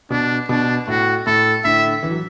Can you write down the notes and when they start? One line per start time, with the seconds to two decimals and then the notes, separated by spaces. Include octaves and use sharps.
0.10 B2 D4
0.49 B2 D4
0.88 A2 F#4
1.26 A2 A4
1.64 A2 D3 E5
2.03 E3
2.11 F#3